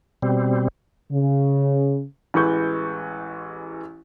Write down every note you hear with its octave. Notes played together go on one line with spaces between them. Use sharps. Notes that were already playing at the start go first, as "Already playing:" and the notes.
B2 G3 C4
C#3
A1 E3 G#3 B4 C#6 G6